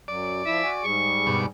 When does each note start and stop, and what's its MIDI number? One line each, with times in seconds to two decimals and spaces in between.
0.08 0.42 42
0.08 0.42 54
0.08 0.86 74
0.46 0.62 53
0.46 0.62 64
0.46 0.69 76
0.63 0.83 66
0.63 0.83 80
0.84 1.47 44
0.84 1.47 55
0.84 1.47 68
0.84 1.41 85
1.27 1.46 43
1.27 1.46 47
1.27 1.46 86